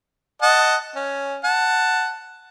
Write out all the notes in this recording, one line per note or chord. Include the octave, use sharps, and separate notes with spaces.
D#5 F#5 A5
C#4
F#5 A5